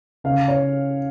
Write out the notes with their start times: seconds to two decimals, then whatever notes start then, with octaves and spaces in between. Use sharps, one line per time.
0.24 C#3 F5
0.48 C#5